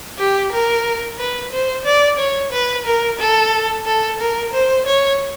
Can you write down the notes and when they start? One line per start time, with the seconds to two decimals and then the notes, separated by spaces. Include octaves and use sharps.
0.18 G4
0.52 A#4
1.19 B4
1.52 C5
1.85 D5
2.18 C#5
2.52 B4
2.85 A#4
3.19 A4
3.85 A4
4.19 A#4
4.53 C5
4.86 C#5